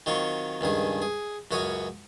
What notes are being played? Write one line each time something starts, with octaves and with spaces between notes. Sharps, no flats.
D#3 F#3 C4 F4 C#6
C#2 G2 D#3 G#4
G#4
C#2 F#2 F#4 C#5 D#6